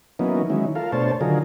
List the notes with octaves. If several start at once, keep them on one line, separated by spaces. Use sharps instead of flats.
E3 F#3 A#3 B3 C#4 D#4
D#3 F#3 G#3 C#4 E4
F4 A4 A#4 F5
B2 A3 D4 C5 C#5 A5
D3 D#3 F#3 F4 G#4 A#4